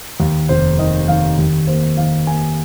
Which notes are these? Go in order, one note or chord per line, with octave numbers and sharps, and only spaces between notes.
D#2
F1 C5
D#3 D#5
D#3 F5
D#2
A#3 C5
D#3 F5
A#3 G#5